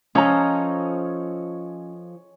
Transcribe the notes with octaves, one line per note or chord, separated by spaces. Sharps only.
F3 C#4 A4 C#5 D#5 G#5 A#5